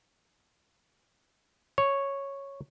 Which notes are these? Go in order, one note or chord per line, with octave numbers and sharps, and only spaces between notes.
C#5